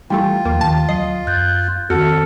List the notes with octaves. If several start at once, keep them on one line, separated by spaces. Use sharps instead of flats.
E3 G3 A3 F4 G5
D#2 F3 A#3
D#2 D#3 A3 A5
D2 F#3 D#5 C7
F#2 F#6 G6 A6
F2 D#3 C4 F#4 A4 F6 C#7